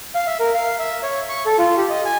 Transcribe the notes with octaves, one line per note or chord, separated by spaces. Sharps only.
F5
E5
A#4
F5
E5
C#5
C#6
A4
F4
G4
D#5
G#5